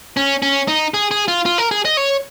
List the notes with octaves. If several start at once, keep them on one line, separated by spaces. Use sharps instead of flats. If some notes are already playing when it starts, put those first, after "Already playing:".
C#4
C#4
D#4
G#4
G#4
F4
F4
A#4
G#4
D#5
C#5